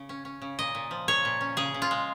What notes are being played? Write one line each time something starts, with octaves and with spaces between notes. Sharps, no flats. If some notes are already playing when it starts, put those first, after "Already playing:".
Already playing: C#3
C#4
C#4
C#3
A#2 D#5
A#2
F3
A#2 C#5
A#2
C#4
C#3 G#4
C#3
F4
G#3